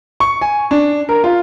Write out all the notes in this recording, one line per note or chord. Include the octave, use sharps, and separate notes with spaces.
C#6
G#5
D4
A#4
F4